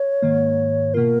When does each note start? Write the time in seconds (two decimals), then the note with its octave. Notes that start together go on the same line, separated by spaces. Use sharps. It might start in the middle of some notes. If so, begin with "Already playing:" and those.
Already playing: C#5
0.22 G#2 D#3 A#3
0.94 B2 A#3 F4 A#4